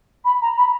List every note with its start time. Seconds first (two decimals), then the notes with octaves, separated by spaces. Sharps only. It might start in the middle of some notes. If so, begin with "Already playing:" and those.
0.24 B5
0.41 A#5
0.57 B5